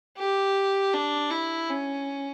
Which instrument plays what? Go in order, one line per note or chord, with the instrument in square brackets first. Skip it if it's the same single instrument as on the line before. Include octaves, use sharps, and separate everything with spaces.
[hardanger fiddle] G4
D4
E4
C#4